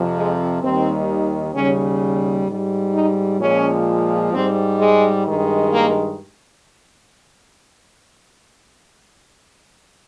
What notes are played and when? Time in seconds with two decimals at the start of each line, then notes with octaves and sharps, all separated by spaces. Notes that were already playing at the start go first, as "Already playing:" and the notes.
Already playing: F2 C3 F3
0.16 G#3
0.62 D#2 D#3 G3 C4
1.54 D#2 C#3 G3 C#4
2.48 G#2 G3
2.94 D#4
3.40 A#2 F3 G#3 C#4
4.33 G#2 G3 C4
4.79 G#3
5.25 G2 D#3 G#3
5.72 A#3